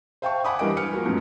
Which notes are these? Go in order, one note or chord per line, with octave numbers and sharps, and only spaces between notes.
C5 E5 F5 G5 A5 C#6
F5 F#5 G#5 B5 D6 D#6
G2 E3 G3 A#4 D#5 D7
B4 G#5 F6 C#7
F3 A#3 F#4 A#4
F#2 A2 F#3 G#3 B3 C#4